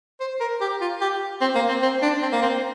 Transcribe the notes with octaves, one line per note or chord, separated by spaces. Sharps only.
C5
A#4
G4
F4
G4
C4
A#3
C4
C4
D4
C4
A#3
C4